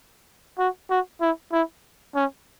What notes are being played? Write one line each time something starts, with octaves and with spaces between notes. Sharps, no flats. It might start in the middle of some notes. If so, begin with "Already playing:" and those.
F#4
F#4
E4
E4
C#4